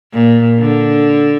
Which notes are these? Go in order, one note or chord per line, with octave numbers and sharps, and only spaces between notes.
A#2
D3